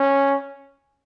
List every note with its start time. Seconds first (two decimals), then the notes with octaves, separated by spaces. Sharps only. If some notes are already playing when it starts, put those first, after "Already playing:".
Already playing: C#4